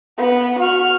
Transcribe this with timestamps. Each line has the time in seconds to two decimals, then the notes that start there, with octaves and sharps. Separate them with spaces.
0.18 B3
0.59 F#4 F6